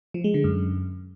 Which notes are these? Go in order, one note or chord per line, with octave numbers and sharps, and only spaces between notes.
F3
G#3
D3
F#2